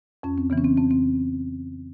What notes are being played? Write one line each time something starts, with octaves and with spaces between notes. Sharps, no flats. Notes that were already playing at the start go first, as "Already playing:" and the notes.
F2 C#4
C4
C#3 E3 B3
C#4
C4
F2 C4
C4